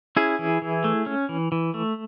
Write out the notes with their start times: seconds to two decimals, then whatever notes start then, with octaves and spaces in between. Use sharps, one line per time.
0.16 C#4 E4 G#4
0.39 E3
0.62 E3
0.84 A3
1.06 C#4
1.29 E3
1.52 E3
1.74 A3